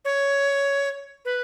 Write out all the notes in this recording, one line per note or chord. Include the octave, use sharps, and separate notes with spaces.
C#5
B4